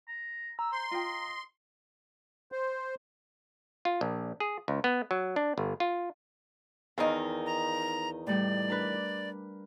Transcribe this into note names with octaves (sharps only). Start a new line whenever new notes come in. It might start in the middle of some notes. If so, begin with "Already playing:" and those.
A#5
A#5 E6
C5 C6
F4 D#5 G5
C5
F4
A#1
G#4
C#2
B3
F#3
D4
G1
F4
E2 D#3 D#4 F5
A#5
A2 G3 D5
D4 A#4 B4